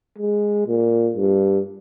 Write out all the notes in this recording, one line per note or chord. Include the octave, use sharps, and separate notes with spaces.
G#3
A#2
G2